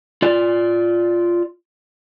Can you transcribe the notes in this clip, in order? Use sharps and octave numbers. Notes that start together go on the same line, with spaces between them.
F4 D5